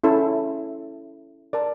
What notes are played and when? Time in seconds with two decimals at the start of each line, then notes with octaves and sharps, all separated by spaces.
0.04 C#4 E4 A4
1.53 A#4 D5 A5